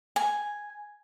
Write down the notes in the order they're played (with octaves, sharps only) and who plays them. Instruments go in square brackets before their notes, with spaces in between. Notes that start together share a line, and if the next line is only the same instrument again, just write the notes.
[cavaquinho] G#5